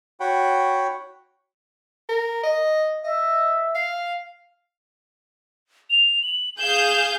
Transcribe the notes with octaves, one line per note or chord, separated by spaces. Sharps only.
F#4 C#5 F#5 G5 B5
A#4
D#5
D#5 E5
F5
F7
F#7
G#4 F5 G6 E7